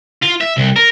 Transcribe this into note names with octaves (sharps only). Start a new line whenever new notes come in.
F4
E5
C2
A#4